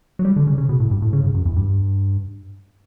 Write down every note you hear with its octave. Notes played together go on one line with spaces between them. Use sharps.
F#3
G3
D3
C#3
C#3
B2
A2
G2
A2
C#3
G2
F#2
E2
G2